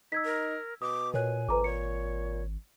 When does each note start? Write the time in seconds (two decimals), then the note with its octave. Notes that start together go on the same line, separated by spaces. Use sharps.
0.12 D#4 E6 G#6 B6
0.25 A#4
0.82 B2 D6 D#6
1.14 A#2 A#4 C#5 G#5 F#6
1.49 G#1 F2 B4 A#5 D6
1.64 A#2 C#5 C#7